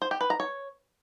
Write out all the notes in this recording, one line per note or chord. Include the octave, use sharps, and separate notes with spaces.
C5
G4
B4
A#5
C#5